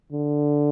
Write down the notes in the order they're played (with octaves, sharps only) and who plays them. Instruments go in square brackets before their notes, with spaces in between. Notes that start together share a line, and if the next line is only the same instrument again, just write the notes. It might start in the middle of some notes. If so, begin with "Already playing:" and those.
[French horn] D3